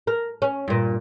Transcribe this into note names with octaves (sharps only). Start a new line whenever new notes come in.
A#4
C#4
G2 A#2